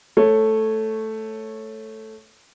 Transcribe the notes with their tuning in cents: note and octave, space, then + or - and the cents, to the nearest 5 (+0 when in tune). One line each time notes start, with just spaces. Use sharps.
A3 +0 C#5 -10